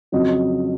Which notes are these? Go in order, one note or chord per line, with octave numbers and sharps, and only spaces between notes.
F2 C#3 F#3 D#5